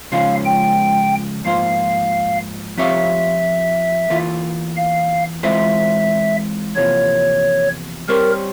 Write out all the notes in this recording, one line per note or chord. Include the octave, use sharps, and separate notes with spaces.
C#2 C#3 F3 G#3 C#4 F5
G5
G#2 F3 A#3 F4 C5 F5
F3 C4 G4 C#5 E5 F5
E2 E3 A#3 F4
F5
E3 G#3 C4 F4 C5 E5
E2 C3 F3 A#3 C#5
G3 C4 G4 A#4 C#5